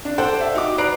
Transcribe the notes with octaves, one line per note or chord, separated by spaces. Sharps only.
D4
A4 C5 D5 F#5 G5
E5
D#4 F#4 D6
B4 D5 A#5 F#6 C7 D7